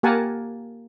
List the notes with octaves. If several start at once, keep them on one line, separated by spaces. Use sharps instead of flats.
A#3 G4 A#4 F#5 G#5 A5